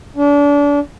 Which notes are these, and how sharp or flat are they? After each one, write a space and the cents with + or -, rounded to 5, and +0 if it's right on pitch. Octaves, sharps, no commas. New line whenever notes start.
D4 -35